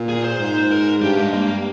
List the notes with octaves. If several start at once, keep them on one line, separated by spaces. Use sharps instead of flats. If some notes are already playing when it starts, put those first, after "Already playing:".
Already playing: A#2
G#4
C5
G#2
A#4
G2 G4
G#3
A#3